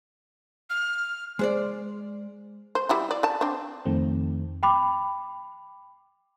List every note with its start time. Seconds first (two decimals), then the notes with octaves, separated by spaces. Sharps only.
0.70 F6
1.39 G#3 C5 D5
2.75 C5
2.89 G3 E4 F#4
3.11 D5
3.23 D5 A5
3.41 C4 D4
3.86 F2 D#3 A3 C4
4.63 G5 B5 D6